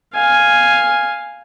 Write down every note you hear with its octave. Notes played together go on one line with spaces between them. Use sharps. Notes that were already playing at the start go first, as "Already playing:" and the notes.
F5 G#5